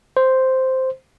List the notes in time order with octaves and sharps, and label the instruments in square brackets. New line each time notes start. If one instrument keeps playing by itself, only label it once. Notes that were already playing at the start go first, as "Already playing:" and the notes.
[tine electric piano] C5